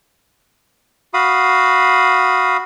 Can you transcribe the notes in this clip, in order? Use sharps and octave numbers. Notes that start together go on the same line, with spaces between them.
F#4 F5 B5 D#6